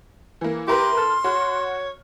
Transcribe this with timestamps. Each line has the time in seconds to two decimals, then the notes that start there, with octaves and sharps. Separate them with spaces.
0.41 E3 A#3
0.68 E4 G4 A#4 B4 C6
0.97 A4 F6
1.24 F#4 C#5